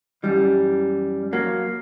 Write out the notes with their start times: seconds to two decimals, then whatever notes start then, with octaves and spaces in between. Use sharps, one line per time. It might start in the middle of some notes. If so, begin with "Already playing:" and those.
0.23 F#2 E3 G3
1.33 F#3 A#3